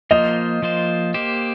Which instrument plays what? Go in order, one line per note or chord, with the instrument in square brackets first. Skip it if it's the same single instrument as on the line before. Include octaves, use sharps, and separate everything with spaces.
[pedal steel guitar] F3 A#3 F4 C5 [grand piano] D#5
[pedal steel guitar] F3 A#3 F4 C5
A#3 G4 C5